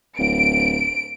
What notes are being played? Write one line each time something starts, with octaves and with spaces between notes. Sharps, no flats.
D1 D7